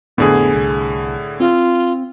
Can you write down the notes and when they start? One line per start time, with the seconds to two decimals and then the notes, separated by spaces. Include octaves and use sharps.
0.18 F1 D#2 A2 D3 B3 G#4
0.54 C2
1.40 C4 F4